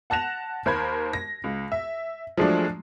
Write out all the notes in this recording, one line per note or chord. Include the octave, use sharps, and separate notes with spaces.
F#5 A5 F#6 A#6 E7 F7
D#2 A#4 C5 B5 G#6
A#6
C#2
E5
F3 F#3 G#3 A3 D4